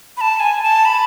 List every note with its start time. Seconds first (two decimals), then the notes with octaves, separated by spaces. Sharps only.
0.17 B5
0.21 A5
0.40 G#5
0.63 A5
0.85 B5